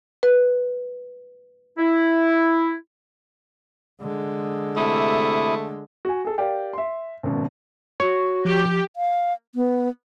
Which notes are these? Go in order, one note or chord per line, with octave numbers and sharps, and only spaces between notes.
B4
E4
D3 G#3
C3 A3 E4 D#6
F#4 G#5
G#4 A4
G4 A#4 D5 F5 G5
E5 C6
G#1 F#2 B2
F#4 C#5
F3 G4
F5
B3